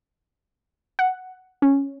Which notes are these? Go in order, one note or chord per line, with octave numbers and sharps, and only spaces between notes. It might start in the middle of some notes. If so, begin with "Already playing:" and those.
F#5
C#4